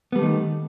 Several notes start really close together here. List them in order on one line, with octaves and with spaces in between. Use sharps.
B3 G3 A3 D#3